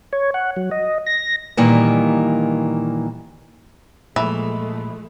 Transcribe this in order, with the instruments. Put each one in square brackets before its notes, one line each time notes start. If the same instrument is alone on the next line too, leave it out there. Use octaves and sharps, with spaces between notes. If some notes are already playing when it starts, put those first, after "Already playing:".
[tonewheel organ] C#5
F#5
F#3
D#5
A#6
[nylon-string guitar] A#2 D#3 E3 G3 A#3
[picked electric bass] A#2 [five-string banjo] E3 [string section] F3 G#3 A3 [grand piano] B5